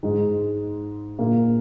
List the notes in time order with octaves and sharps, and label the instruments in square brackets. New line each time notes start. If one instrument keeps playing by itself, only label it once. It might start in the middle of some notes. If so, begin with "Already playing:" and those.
[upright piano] G#2 G#3
A#2 A#3